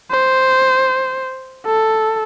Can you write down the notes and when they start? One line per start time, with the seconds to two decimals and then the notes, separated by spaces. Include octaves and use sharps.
0.11 C5
1.66 A4